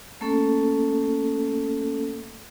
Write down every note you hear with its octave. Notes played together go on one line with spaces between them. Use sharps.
A3 A#3 C#4 A4